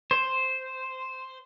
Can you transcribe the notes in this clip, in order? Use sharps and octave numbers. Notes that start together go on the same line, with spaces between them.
C5